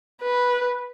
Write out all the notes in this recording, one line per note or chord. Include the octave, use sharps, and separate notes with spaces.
B4